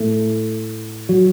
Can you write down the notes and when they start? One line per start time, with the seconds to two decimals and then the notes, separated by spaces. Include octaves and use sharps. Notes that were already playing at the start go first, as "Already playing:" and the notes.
Already playing: A2 A3
1.09 F#3